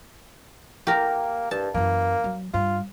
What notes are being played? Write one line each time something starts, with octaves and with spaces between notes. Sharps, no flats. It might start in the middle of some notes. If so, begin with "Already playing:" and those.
A#3 G4 A#4
G2 A5
F#2 E3 A#3
F#3
G2 F4